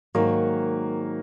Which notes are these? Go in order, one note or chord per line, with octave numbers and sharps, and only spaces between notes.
G#2 D#3 F#3 A#3